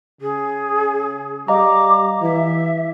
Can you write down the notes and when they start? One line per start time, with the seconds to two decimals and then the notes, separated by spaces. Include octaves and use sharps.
0.21 C#3 G#4
1.48 G3 D#5 F5 A#5 D6
2.22 E3 E5